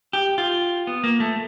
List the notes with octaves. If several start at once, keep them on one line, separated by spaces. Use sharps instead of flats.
G4
F4
B3
A#3
A3